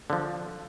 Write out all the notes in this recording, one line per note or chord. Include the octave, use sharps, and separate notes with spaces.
D3 F3